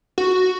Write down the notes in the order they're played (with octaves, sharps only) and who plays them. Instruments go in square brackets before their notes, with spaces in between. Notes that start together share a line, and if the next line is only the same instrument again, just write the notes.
[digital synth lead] F#4